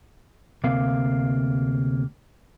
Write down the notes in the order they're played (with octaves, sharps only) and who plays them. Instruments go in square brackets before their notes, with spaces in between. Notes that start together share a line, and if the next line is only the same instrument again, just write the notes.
[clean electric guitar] D2 C3 A#3 F5